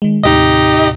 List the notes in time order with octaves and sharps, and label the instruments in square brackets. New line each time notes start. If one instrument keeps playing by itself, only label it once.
[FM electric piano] D#3 G#3
[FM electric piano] D#2 A2 C3 [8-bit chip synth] D#4 G4 D#5